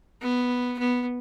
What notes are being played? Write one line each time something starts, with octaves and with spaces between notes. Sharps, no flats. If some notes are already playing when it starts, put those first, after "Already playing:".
B3
B3